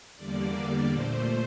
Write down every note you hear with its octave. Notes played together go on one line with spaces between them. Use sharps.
E2 D3 G3 A#3 D5
A#2 A3 C5